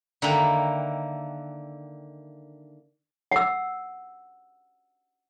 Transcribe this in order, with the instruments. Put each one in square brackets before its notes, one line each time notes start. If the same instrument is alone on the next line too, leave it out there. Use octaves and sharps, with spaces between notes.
[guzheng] D3 D#3 A#3 E4 G5 B5
[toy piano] F#5 E6